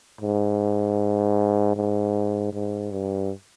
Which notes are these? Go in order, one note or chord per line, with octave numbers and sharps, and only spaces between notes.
G#2
G#2
G#2
G2